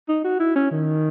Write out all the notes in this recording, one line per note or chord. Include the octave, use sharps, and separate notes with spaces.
D#4
F#4
E4
C#4
D#3